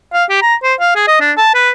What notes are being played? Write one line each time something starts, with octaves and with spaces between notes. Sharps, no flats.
F5
G4
A#5
C5
F5
G#4
D#5
D4
A5
B4